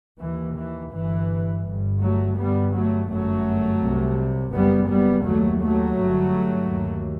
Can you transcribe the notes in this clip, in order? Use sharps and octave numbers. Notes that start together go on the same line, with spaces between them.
D#2 E3
E3
G1 G2 E3
G1 G2
F#3 A3
G1 G2 G3 B3
F#3 A3
G1 F#2 F#3 A3
C2 C3
F#1 F#2 G3 B3
G3 B3
D#2 F#3 A3
F#3 A3
G1 G2
D#2